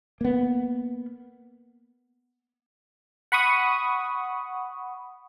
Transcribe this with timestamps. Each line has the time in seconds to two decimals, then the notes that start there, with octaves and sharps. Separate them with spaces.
0.21 A#3 B3
3.32 F#5 B5 C#6 D#6